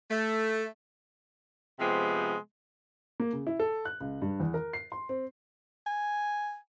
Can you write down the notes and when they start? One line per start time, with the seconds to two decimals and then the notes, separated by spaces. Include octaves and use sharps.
0.10 A3
1.79 C3 F3 G#3 B3 G4
3.20 A#3
3.33 C#3
3.47 E4
3.60 A4
3.85 F#6
4.00 C#2
4.22 G2
4.40 E2
4.54 A#4
4.73 C7
4.92 C6
5.09 C4
5.86 G#5